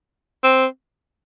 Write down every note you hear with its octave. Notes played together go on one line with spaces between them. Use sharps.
C4